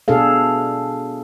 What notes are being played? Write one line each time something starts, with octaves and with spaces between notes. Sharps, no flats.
B2 D4 G#4 A4 F5